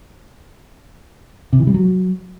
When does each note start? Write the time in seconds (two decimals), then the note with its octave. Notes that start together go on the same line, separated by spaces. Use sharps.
1.53 C3
1.60 E3
1.67 G3
1.74 F#3